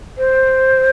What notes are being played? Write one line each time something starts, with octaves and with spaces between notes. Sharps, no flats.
C5